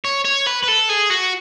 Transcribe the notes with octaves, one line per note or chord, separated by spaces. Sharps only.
C#5
C#5
B4
B4
A4
G#4
F#4